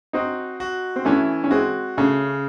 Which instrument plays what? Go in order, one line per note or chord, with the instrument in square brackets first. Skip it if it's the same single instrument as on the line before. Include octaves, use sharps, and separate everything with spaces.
[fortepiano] C4 D#4 [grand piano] F#4
[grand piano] F#4
[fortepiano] C4
[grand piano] E3 [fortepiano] A3 C#4
[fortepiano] C#4
[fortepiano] G#3 C4 [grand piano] F#4
[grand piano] C#3 [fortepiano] A3 C#4